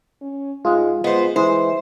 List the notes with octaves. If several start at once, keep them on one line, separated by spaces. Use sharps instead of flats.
C#4
G#2 G#3 F4 F5
G#3 B3 C5 D#5
E3 G#3 E4 C5